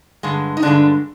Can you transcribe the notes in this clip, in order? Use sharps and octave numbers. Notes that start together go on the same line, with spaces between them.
G2 D3 G#3
D#4
G2 D3 G#3 D4